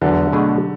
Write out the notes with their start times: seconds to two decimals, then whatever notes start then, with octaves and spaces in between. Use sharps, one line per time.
0.01 E2 D3 F#3
0.32 B2 A3 D4 G#4